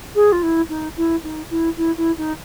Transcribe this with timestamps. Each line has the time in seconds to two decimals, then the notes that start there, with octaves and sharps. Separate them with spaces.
0.15 G#4
0.32 F4
0.43 E4
0.69 D#4
0.97 E4
1.23 D#4
1.50 E4
1.77 E4
1.97 E4
2.17 D#4